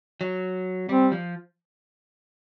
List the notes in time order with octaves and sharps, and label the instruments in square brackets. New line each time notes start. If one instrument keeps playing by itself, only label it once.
[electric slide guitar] F#3
[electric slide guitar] G3 [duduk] C4
[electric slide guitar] F3